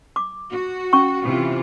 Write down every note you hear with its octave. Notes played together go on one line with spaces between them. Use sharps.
D6
F#4
C#4 C#6
C3 E3 F4